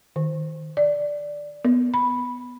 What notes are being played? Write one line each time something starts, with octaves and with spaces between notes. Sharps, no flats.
D#3
D5
B3
B5